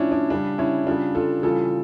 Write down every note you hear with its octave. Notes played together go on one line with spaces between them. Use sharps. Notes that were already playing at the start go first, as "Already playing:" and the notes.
Already playing: A2 F3 C#4 D4 E4 F4
D4
C#3 G3 D4
C#4 E4
C#3 G3 D4 F4
F4 A4
C#3 E3 G3 F4 A4